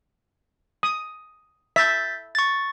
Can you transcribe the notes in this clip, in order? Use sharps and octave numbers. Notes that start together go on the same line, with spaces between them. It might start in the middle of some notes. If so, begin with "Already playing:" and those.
D#6
E5 G6 A6 B6
C#6 A6